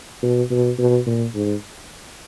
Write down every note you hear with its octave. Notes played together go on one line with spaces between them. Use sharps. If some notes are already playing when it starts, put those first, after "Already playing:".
B2
B2
B2
A#2
G#2